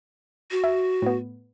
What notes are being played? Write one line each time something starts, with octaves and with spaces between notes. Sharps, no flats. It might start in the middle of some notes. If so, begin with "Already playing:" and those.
F#4
E5
A2 B3